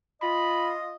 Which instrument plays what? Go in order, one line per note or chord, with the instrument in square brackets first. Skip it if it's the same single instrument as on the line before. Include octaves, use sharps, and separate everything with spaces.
[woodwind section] F4 D#5 [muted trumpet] B5